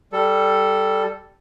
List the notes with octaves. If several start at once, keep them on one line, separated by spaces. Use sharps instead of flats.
G3 A4